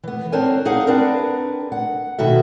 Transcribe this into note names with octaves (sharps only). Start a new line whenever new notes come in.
E3 B3
C4 D4 A#4 C5 C#5 G#5
D#4 G#4 F5 F#5
C4 D4 G#4 A#4 B4
F#5
B2 D#3 F#4 A4 E5